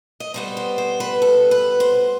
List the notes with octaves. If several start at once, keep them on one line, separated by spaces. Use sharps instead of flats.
D#5
B2 G3 B3 C5
C5
C5
B4
A4
B4
C5